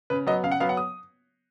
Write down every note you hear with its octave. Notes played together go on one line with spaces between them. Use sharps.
C#3 B4
F#3 B3 D#5
C#3 F5
F#5
F#3 B3 F5
F#5
D#6